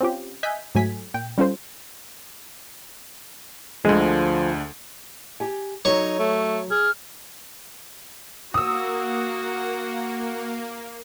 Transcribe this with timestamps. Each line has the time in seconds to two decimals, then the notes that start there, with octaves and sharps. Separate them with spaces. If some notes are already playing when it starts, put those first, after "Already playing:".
0.01 C4 C#4 F4 G4
0.43 D#5 E5 G#5 F#6 G6 B6
0.75 G#2 F#3 A3 G#5 B6
1.14 A#2 G5
1.38 G3 C#4 F4 A4 C5
3.85 D2 D3 F3 G#3
5.40 G4 G#5
5.85 F#3 D#4 F#4 A4 C#5 C#6
6.19 A3
6.71 G#4 F6
8.54 A#3 F#4 F#5 D#6 E6